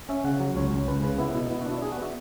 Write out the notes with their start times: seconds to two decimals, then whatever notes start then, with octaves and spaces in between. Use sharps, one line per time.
0.09 C#4 E5
0.24 C#3 F#5
0.40 F#3
0.56 C#2 C#5
0.71 C#2
0.87 C#2 B4
1.03 C#3 B4
1.18 B3 E4
1.34 B2 E4
1.50 B3 E4
1.61 F#4
1.66 D4
1.71 E4
1.82 D4 G#4
1.92 F#4
1.97 B3 E5